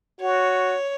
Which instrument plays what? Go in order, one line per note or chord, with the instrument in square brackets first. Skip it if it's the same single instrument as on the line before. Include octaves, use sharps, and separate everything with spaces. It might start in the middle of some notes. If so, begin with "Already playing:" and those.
[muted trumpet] F#4 [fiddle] C#5